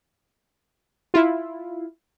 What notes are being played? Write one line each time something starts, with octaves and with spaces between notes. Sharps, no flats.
E4 F4